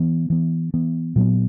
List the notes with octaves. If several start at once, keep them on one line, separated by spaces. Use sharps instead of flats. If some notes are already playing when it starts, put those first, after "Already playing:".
Already playing: E3 B3
E3 B3
E3 B3
A#2 F#3 B3